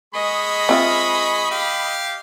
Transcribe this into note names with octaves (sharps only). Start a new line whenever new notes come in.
G#3 G#4 D#5 B5 C#6
C4 F4 E5
G4 F5